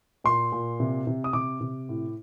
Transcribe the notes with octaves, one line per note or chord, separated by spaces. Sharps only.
A#2 C6
A#2
C3
C3
D#6
C3 D6
C3
A2